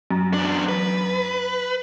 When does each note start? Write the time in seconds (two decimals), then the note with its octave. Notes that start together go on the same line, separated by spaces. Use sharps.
0.11 F#2
0.34 E2 D4
0.69 B4